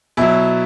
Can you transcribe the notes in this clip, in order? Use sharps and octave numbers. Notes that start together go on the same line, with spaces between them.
B2 F#3 E4